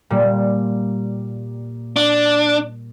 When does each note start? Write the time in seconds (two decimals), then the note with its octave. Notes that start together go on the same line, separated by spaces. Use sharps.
0.10 A#2 G3
1.96 D4